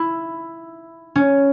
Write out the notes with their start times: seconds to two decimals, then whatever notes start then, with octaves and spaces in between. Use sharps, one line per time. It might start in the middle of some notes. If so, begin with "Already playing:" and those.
Already playing: E4
1.16 C#4